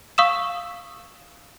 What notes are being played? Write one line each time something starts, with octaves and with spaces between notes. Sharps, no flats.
F5 C#6 D#6 E6 E7